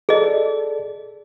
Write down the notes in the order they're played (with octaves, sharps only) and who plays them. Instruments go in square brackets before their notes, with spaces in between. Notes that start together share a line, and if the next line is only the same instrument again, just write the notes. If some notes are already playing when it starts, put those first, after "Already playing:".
[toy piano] G#4 D#5 [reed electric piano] A4 D5